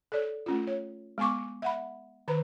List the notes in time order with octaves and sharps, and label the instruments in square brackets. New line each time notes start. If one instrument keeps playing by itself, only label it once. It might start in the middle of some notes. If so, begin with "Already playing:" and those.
[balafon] A4 C#5 D5
A3 C#4 F4
C#5
G#3 B3 G#5 C#6 D6
E5 F#5 B5
D#3 B4 A#5